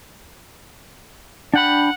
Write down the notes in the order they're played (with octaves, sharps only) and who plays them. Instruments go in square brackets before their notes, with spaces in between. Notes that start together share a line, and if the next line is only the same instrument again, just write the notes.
[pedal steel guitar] D4 G5 B5 [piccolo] F#5